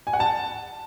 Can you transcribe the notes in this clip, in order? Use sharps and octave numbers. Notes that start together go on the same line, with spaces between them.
G#5
F#5
A5